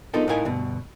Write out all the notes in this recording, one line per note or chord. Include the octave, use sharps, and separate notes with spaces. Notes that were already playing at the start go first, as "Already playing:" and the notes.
B3 D4 D#4 F4 A4 A#4
A2 D#4 E4 A#4 F5 G#5
D2 G2 B2